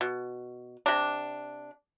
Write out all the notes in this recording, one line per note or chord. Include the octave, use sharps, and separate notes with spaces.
B2
C3 D4